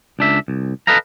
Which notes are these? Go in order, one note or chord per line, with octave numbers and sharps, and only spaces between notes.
C#2 D4 E5
C2
A4 B4 D#5 F5 A#5